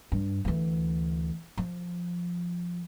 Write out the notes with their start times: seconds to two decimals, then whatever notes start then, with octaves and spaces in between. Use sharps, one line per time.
0.12 G2
0.45 D2 E3
1.57 F3